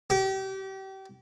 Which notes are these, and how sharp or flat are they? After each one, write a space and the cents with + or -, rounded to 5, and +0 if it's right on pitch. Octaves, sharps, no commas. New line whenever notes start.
G4 -30